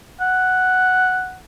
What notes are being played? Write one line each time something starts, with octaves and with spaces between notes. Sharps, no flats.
F#5